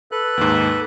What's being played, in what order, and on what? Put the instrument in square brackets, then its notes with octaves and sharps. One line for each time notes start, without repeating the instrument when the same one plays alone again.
[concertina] A4 B4 F#6
[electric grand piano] D#2 G#2